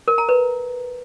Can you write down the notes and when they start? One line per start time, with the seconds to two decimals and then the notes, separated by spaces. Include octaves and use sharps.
0.08 A#4
0.18 A#5
0.29 B4